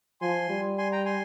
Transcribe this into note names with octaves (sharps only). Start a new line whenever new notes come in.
F3 G#5 C6
G3
G#5 C6
G5 A#5
G#5 C6